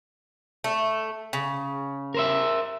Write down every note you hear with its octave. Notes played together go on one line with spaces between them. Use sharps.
A3
C#3
A#4 C5 E5